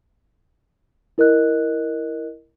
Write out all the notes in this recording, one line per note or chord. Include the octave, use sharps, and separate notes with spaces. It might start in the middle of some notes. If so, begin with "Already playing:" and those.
E4 A#4 D#5 F#6